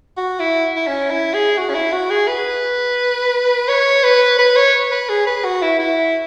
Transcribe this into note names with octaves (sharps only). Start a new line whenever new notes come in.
F#4
E4
E4
C#4
E4
G#4
F#4
C#4
E4
F#4
G#4
B4
C#5
B4
B4
C#5
B4
G#4
B4
F#4
E4
E4